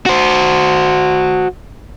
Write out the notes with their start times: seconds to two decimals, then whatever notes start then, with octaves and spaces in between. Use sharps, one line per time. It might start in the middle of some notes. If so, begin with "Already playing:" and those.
0.06 F#4 C5